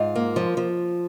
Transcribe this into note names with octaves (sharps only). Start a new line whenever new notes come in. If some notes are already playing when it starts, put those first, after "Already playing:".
Already playing: G#2 F4
A#3
F3
F3